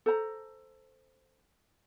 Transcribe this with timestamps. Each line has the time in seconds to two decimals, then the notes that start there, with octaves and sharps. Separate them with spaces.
0.06 A4 C5 A#5